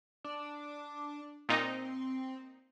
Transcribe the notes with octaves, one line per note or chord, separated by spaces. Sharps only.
D4
A#2 C4 D#4